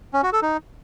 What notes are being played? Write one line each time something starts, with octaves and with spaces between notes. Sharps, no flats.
C#4
F#4
A4
D#4